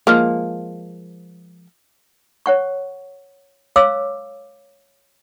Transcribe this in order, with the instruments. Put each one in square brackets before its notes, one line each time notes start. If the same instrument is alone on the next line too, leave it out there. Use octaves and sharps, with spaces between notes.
[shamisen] F3 G#3 A#3
[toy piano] C#5 F#5 C#6
C#5 F5 D6 E6